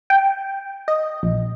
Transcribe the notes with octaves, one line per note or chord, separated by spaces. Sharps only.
G5
D#5
A#1